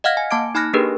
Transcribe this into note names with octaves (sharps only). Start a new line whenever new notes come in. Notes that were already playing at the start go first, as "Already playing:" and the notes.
D#5 F5 F#5 F6 G#6 A#6
G#5
A#3 A5 D6 G#6 D7
D#4 G#5 B5 F6 F#6 A#6
A#3 D4 G4 G#4 A#4 B4